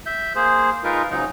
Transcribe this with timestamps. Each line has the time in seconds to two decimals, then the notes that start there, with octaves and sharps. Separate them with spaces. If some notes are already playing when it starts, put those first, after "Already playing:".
0.06 E5 G6
0.35 A#3 G#4 C5
0.84 G#3 D#4 F4 A#4 B4
1.11 G#2 C#3 F#3 D#4